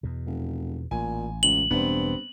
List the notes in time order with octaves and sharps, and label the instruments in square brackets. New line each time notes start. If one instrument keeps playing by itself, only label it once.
[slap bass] E2 B2
[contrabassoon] F1
[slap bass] A1 [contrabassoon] A#2 [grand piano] G#5
[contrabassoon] C#2 [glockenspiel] F#7
[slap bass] E1 [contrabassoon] G2 [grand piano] B3 C4